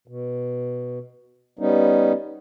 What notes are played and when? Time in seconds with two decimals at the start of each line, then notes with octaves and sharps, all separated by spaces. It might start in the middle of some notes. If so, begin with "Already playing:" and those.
0.08 B2
1.59 G3 B3 C#4 D#4